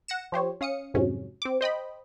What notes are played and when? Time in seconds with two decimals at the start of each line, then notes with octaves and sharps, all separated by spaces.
0.08 F#5 A#6 C#7 E7
0.32 F3 G4 C5 C#5
0.61 C#4 F5 D#6 C#7
0.94 F2 G#2 C3 F#3 C#4
1.42 C4 D6
1.61 C5 D#5 G5 B5